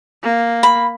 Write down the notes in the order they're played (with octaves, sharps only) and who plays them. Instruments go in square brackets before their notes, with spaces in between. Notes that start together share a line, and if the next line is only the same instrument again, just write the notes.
[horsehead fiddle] A#3
[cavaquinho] B5